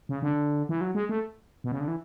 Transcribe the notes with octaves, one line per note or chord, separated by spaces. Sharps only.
C#3
D3
E3
F#3
G#3
A3
B2
C#3
D3
E3